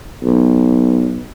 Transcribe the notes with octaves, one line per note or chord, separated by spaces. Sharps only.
B1